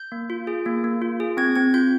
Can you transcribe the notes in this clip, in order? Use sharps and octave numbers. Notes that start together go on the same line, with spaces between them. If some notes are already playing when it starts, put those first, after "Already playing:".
Already playing: G6
A#3
F4
G#4
A#3
A#3
F4
G#4
C4 G#6
C4 G#6
F4 G6